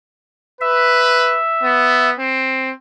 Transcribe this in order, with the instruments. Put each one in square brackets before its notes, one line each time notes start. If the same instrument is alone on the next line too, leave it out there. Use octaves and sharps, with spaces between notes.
[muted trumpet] B4 [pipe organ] E5
[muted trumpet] B3
C4